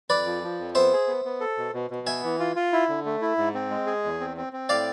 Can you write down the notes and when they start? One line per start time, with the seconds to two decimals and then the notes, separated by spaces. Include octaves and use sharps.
0.10 F2 B4 D5
0.26 F3
0.43 F3
0.60 F2
0.75 B3 C5 E5
0.92 G#4
1.08 B3
1.25 B3
1.40 A4
1.57 B2
1.74 B2
1.90 B2
2.07 B3 E5 G#5
2.24 E3
2.40 F4
2.56 F4
2.73 E4
2.89 D3
3.06 A3
3.21 E4
3.37 G#2
3.54 C4
3.70 G#3
3.87 G#4
4.04 E2
4.20 C4
4.37 C4
4.53 C4
4.69 A2 D5 F5